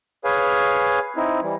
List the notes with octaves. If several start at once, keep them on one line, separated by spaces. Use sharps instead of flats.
G#4 B4 C#5 F5 G#5
C4 D#4 E4
E3 G3